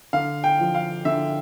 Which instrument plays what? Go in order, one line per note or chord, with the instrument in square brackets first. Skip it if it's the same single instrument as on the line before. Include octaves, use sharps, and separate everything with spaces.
[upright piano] D3 F5
G5
F3
F5
D3 E5